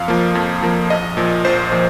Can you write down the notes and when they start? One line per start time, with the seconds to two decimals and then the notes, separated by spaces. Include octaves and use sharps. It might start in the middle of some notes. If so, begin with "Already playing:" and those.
Already playing: F2 F5
0.08 F3 A#3
0.35 F2
0.62 F3 A#3
0.90 A#1 D#5
1.17 A#2 F3
1.44 A#1 C5
1.72 A#2 F3